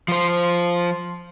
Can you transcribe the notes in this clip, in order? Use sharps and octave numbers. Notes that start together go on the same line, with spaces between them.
F3 C5